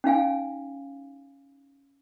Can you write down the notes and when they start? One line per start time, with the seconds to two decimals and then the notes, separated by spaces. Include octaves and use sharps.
0.04 C#4 D#4 F5 G#5